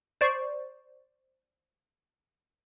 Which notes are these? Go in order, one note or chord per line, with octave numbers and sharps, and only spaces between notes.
C5 D5 C#6